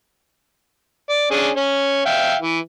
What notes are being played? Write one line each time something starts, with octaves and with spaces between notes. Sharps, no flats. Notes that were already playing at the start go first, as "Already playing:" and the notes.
D5
C#4 D4 G#4
C#4 C#5
E5 F5 G5
E3